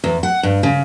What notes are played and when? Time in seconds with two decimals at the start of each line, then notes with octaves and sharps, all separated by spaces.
0.04 E2
0.23 F#5
0.43 G2
0.63 C#3